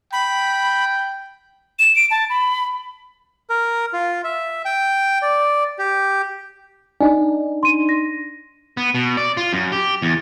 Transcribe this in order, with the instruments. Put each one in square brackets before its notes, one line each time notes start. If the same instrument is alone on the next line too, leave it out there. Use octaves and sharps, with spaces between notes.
[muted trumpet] G5 [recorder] B5
[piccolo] E7
D7
A5
B5
[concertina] A#4
F4
E5
G5
D5
G4
[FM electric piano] D4 D#4 [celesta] G#5
[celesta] C6 D#7
A#6
[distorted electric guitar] B3
B2
D5
F4
F#2
G4
E2